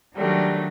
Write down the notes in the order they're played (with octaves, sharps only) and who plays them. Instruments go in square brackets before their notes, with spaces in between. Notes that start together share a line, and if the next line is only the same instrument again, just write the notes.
[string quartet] D#3 F#3 A3 D4 [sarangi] G3